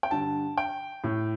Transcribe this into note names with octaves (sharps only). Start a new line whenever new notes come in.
G5
G2 D3 A5
G5
A2